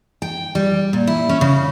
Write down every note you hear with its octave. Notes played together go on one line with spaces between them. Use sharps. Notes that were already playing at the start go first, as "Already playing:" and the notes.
G5
G3
A#2
E4
C#4
C#3